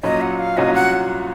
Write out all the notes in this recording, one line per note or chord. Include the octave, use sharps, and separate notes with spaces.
A#2 F#3 C#4 D#5
F#5
F5
C2 A#2 F#3 C#4 F#4 D#5
F#5